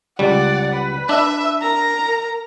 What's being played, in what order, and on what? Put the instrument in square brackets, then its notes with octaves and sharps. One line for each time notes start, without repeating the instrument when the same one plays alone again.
[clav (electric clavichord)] C#2 G3 [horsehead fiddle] D5 [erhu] F#5
[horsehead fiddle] B4
[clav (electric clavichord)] D4 [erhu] E5
[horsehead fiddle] A#4 [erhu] A#5